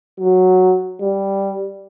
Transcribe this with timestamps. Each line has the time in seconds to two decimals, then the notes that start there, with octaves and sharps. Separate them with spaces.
0.19 F#3
1.01 G3